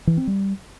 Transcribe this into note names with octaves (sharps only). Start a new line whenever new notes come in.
E3
C4
G3